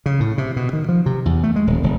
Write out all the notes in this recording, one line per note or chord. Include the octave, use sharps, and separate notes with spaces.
C#3
A2
C3
B2
D#3
F3
C3
E2
A3
G#3
D#1
E1